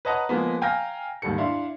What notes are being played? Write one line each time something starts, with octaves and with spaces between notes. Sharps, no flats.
B4 C#5 D#5 F#5 A5 A#5
F3 G#3 A#3 B3
F5 G5 G#5 A#5 F6 A#6
D#2 G#2 G3 A4 C#7
D4 E4 F5 C6